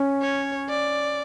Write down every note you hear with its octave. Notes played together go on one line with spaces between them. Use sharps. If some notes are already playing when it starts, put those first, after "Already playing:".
Already playing: C#4
C#5
D5